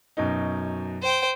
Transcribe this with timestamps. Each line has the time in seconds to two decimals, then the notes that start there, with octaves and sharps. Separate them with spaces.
0.17 F#2 B2 D#4
1.02 C5 G5